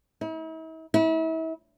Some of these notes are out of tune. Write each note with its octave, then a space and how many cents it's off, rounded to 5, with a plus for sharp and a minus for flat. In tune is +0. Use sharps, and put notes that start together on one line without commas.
E4 -45
E4 -35